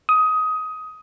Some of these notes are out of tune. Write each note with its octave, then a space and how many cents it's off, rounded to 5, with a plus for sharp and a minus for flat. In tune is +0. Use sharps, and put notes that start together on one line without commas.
D#6 +15